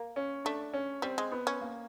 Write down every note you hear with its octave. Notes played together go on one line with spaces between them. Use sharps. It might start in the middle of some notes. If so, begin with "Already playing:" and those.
Already playing: A#3
C#4
A3 D4
C#4
G3 C4
G#3
B3
C#4
A#3